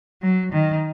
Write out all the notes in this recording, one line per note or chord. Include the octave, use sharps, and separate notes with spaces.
F#3
D#3